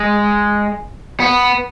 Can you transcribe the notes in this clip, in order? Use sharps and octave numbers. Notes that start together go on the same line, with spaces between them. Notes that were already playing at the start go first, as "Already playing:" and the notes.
Already playing: G#3
B3